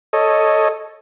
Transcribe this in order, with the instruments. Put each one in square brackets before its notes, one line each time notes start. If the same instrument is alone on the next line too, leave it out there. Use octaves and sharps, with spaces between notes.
[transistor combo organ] A4 C#5 D#5